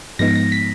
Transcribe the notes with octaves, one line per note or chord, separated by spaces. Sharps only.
G#2 F3 G#3 B3 D#4 A#6
A#6
B6